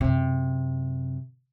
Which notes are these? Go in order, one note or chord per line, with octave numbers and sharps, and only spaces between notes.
F#2 C3